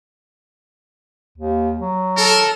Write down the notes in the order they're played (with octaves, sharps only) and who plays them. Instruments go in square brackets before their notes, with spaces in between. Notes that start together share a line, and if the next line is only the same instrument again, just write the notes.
[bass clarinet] D#2
F#3
[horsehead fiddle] A4 [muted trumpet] A#4